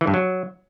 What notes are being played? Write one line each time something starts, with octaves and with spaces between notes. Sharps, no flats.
E3
G2
F#3